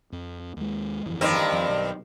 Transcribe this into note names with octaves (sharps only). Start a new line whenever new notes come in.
F2
D#2 G#3
G1 F2 E3
G2 D#3 C4
F2
B1